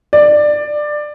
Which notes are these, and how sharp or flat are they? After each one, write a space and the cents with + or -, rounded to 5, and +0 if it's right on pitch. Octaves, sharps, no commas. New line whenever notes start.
D5 +15